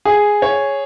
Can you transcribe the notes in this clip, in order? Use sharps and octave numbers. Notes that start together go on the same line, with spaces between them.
G#4
C#5